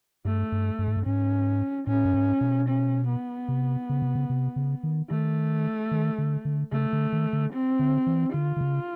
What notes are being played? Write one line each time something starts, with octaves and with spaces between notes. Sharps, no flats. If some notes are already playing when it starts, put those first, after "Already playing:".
G2 A3
G2
G2
G#2
G2
G#2 C#4
A2 C#4
G2
G#2
B2
C#4
B3
C3
C#3
C3
C#3
C3
C#3
D#3
D#3 A3
D#3
D3
D3
C#3 A3
D3
D#3
D3
C4
D3
E3
D3 F4
D3
C#3